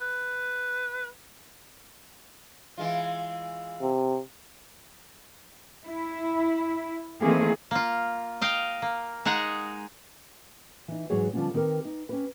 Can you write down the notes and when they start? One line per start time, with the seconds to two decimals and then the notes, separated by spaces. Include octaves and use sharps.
0.01 B4
2.78 E3 G#3 F4
3.82 C3
5.88 E4
7.21 D#3 E3 A3 A#3 C4 G#4
7.71 A#3 F4
8.41 D#5 F5 G5
8.82 A#3
9.25 G#3 D#4 G#4 F#5 A#5
10.88 E3 D#4
11.10 G#2 E3 F#3 F#4 G#4 C#5
11.33 D3 F3 G3 G#3 B3 C#4
11.54 D#3 C4 G4 A#4 B4
11.85 D#4
12.09 C#4 G4 B4